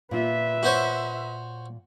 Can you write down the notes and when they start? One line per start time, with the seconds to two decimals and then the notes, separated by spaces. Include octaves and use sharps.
0.11 A#2 F4 B4 E5
0.63 F#4 C5 C#5